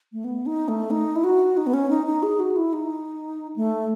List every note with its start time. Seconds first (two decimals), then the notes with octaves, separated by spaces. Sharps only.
0.13 A3
0.24 B3
0.46 D#4
0.68 A3
0.91 D#4
1.16 E4
1.24 F#4
1.57 D#4
1.67 B3
1.74 C#4
1.90 D#4
2.06 D#4
2.23 G#4
2.40 F#4
2.56 E4
2.73 D#4
3.56 A3